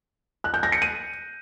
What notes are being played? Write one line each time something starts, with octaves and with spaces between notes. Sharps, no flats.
F#6
G6
A#6
C#7
D#7